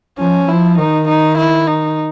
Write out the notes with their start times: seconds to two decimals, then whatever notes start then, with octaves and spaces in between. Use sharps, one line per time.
0.18 F3 C#4
0.49 F3 E4
0.78 D#3 D#4
1.08 D#4
1.38 E4
1.68 D#4